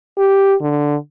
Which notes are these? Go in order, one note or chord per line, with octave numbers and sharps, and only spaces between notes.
G4
D3